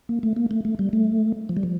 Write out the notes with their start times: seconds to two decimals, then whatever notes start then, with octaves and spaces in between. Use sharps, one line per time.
0.09 A#3
0.23 A3
0.36 A#3
0.51 A3
0.65 A3
0.79 G3
0.93 A3
1.49 F3
1.57 G3
1.63 F3